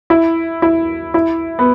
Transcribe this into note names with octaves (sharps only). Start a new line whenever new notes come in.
E4
E4
E4
B3